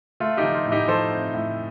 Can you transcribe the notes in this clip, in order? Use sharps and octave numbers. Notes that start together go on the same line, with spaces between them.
A3 F4
D#4 G4
F3
F4
A2
D#4 G4
F3 A4 C5
C4
A2